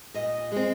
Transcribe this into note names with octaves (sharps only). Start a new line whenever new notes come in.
A#2 D#5
G#3 C4